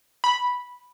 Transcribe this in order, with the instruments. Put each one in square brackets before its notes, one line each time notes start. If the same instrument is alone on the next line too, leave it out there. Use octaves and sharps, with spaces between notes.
[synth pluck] B5